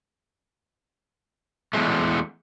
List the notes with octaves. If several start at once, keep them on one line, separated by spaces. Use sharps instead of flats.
E2 C#3 G#3 A3